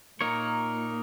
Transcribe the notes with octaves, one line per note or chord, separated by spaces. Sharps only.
A#2 A#3 D#4 A#4 C#5